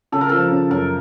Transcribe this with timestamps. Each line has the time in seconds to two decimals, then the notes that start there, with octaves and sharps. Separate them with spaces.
0.12 C#3 A4
0.21 A#4
0.29 F3 A4
0.51 C#3
0.70 F#2 A#4